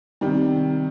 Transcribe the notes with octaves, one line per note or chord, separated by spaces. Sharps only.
C3 D#3 G3